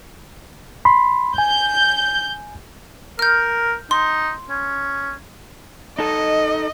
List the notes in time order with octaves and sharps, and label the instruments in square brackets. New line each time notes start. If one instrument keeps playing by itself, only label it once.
[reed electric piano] B5 C6
[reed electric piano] G#5 [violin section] G6
[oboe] A#4 [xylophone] F6 G6
[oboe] D#4 [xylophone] C6
[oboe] C#4
[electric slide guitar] D#4 A4 [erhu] D#5